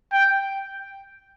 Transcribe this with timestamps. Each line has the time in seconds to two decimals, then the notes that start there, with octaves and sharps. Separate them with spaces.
0.13 G5